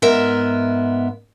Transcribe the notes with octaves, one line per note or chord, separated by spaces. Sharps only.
G#2 B3 A#4 E5